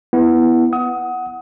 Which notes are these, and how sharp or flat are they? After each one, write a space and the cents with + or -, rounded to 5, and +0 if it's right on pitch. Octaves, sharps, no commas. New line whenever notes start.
B3 +0 E4 +0
F#5 +0 D#6 +25